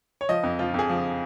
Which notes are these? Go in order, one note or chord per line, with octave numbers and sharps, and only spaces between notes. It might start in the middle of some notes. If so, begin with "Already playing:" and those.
C#5
F3 D#5
F2
F3 F4
F2 G#4
F3